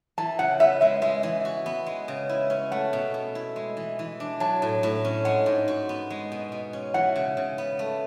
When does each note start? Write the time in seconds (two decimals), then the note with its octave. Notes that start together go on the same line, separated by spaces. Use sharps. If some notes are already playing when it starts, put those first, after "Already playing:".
0.18 E3 A5
0.39 C#3 F#5
0.60 B3 E5
0.81 G#3 E5
1.02 G#3 E5
1.23 E3
1.45 F#4
1.66 B3
1.86 G#3
2.08 C#3
2.29 E4
2.50 C#4
2.71 A3 F#5
2.93 B2
3.14 B2
3.35 E4
3.56 G#3
3.77 E3
3.99 E3
4.20 D4
4.40 F#3 A5
4.62 A2
4.83 A2
5.05 C#4
5.25 G#3 F#5
5.46 G#2
5.68 F#4
5.89 B3
6.10 G#3
6.32 B2
6.52 B2
6.73 C#4
6.94 E3 F#5
7.16 C#3
7.37 C#3
7.58 B3
7.79 A3